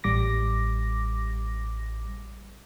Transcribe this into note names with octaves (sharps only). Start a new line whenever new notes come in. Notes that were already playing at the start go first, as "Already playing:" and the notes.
A1 G3 D6 A#6